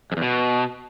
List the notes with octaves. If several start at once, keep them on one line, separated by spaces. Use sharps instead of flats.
F2
E2
B2